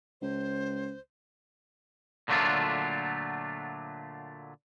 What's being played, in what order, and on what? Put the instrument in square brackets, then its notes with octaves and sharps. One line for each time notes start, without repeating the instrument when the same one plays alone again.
[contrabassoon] C#2 [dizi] C5
[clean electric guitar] A#2 D3 F#3 A3 D4 F4